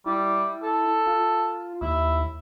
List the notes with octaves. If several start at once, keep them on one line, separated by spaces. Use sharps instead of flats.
G3 E4
A4
F4
D#2 E4